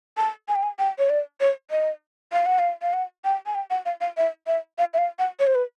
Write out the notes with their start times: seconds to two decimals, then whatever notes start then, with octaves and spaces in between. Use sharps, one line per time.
0.17 A5
0.48 G#5
0.55 G5
0.63 G#5
0.79 G5
0.98 C#5
1.10 D5
1.40 C#5
1.71 D#5
2.32 F5
2.46 F#5
2.59 F5
2.82 F5
2.93 F#5
3.24 G5
3.46 G#5
3.55 G5
3.70 F#5
3.86 F5
4.01 F5
4.17 E5
4.47 E5
4.78 F5
4.94 E5
4.98 F5
5.19 F#5
5.39 C#5
5.47 C5
5.55 B4